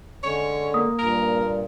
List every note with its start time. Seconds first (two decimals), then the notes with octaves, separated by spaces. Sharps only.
0.23 D3 G#3 C#4 C#5
0.74 A#3 D#6
0.99 G2 A#2 A#4